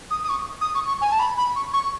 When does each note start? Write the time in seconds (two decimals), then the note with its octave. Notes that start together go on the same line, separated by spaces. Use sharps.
0.11 D#6
0.23 D#6
0.29 C#6
0.61 D#6
0.75 C#6
0.88 C#6
1.01 G#5
1.11 A5
1.19 B5
1.38 B5
1.56 C#6
1.74 C#6